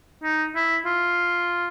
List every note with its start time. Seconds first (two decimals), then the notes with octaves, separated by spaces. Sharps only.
0.23 D#4
0.55 E4
0.86 F4